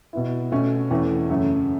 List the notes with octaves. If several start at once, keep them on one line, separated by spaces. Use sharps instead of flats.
B2 B3 E4
B2 A3 C#4
E2 E3 A3 C#4
F#2 C#3 A3